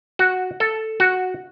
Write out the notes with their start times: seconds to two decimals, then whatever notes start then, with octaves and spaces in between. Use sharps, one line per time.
0.19 F#4
0.60 A4
1.00 F#4